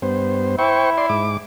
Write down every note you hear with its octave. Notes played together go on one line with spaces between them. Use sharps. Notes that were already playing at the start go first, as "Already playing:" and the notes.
G2 B3 C5
E4 C5 G5 C#6
D5 C6
G#2 D6